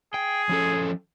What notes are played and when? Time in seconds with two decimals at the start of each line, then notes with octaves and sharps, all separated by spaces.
0.14 G#4 G5
0.49 F3 C#4 A4